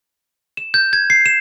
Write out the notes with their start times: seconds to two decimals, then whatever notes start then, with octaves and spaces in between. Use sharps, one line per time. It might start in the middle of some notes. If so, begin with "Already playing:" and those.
0.57 E7
0.74 G6
0.93 G#6
1.10 C7
1.26 E7